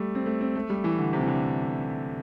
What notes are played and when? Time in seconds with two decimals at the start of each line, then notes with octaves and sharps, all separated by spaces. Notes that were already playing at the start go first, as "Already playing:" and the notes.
Already playing: G3 A3
0.15 C4
0.26 A3
0.41 C4
0.56 A3
0.70 G3
0.84 E3
0.98 D3
1.13 C3
1.21 E3
1.27 D3